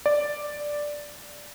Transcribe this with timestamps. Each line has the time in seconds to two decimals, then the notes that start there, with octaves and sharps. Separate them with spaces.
0.06 D5